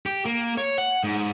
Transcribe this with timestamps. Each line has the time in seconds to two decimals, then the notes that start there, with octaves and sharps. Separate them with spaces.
0.06 G4
0.25 A#3
0.57 C#5
0.78 F#5
1.04 G#2